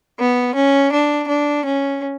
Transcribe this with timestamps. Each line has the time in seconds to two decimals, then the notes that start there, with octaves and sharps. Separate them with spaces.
0.19 B3
0.55 C#4
0.91 D4
1.27 D4
1.64 C#4